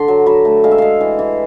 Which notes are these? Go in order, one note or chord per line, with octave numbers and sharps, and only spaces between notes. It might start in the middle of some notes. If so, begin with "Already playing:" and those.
Already playing: D3 C6
F#3
F#3 B5
A3
G#3 F5
E5
G#3 F5
E3
E3